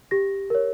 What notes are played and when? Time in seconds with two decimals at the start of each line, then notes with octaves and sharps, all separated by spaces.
0.11 G4 A#6
0.50 A#4 C#5